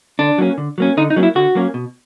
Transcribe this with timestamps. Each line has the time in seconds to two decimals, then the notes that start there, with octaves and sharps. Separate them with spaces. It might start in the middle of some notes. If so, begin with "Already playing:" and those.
0.19 D3 D4
0.38 F#3 A#3 C#4
0.58 D3
0.78 F#3 A#3 C#4
0.97 D3 D#4
1.10 D#4
1.16 F#3 A#3 C#4
1.23 E4
1.35 D3 F#4
1.55 F#3 A#3 C#4
1.74 B2